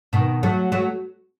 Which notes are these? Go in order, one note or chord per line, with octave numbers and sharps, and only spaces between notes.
B2 D#3
F#3 A3
F#3 A3